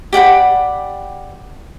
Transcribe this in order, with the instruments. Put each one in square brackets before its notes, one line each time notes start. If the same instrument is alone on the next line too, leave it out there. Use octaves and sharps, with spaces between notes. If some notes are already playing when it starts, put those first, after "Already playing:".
[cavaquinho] G4 D5 F#5 B5